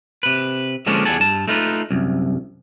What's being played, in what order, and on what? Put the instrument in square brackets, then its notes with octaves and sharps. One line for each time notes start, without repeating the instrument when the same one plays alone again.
[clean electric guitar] C3 B4
D3 F3 G#3 A#3 C#4 D4
E2 G3 G#4 F#5 A5
G2 A5
A3 D#4 F4 B4
C2 F#2